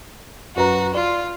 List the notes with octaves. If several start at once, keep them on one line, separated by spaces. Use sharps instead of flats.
F#2 F#4 B4 A#5
F4 D5